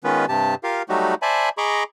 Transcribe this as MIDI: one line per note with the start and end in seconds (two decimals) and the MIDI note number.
0.04 0.26 51
0.04 0.26 56
0.04 0.26 59
0.04 0.26 61
0.04 0.26 65
0.04 0.26 71
0.29 0.55 43
0.29 0.55 48
0.29 0.55 67
0.29 0.55 81
0.64 0.82 65
0.64 0.82 67
0.64 0.82 70
0.64 0.82 77
0.89 1.15 54
0.89 1.15 55
0.89 1.15 57
0.89 1.15 63
0.89 1.15 66
0.89 1.15 67
1.22 1.49 72
1.22 1.49 74
1.22 1.49 76
1.22 1.49 80
1.22 1.49 81
1.22 1.49 83
1.58 1.84 68
1.58 1.84 75
1.58 1.84 82
1.58 1.84 83
1.58 1.84 85
1.58 1.84 86